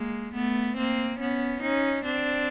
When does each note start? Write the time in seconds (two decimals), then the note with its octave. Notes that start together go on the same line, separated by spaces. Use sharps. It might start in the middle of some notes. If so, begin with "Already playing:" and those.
Already playing: G#3 A#3
0.34 A3 B3
0.77 A#3 C4
1.20 B3 C#4
1.62 C#4 D#4
2.05 C4 D4